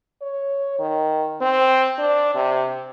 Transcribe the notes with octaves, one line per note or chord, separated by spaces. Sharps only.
C#5
D#3
C4
D4
C3